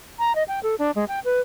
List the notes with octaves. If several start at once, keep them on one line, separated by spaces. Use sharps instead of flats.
A#5
D#5
G5
A4
D4
G#3
G5
B4